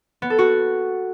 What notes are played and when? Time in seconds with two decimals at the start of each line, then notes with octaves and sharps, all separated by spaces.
0.22 B3
0.30 A4
0.38 F#4